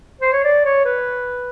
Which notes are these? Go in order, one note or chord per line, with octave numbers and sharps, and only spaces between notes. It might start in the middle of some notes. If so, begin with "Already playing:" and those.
C5
C#5
D5
C#5
B4